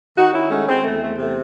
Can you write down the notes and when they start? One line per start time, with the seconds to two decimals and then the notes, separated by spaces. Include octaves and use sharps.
0.17 D#3 D#4 F#4
0.34 C#4 E4
0.50 G#3 A3 C#4
0.68 G#3 C4
0.84 E2 A3
1.02 A3
1.18 C3 A3